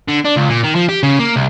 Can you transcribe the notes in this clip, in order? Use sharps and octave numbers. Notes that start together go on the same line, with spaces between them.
D3
D4
C#2
A#2
D#3
F3
G4
C#3
A#3
C2